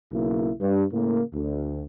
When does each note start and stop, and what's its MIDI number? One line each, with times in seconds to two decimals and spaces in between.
0.12 0.51 35
0.12 0.51 49
0.12 0.51 58
0.12 0.51 64
0.60 0.83 43
0.92 1.21 45
0.92 1.21 49
0.92 1.21 58
1.33 1.82 38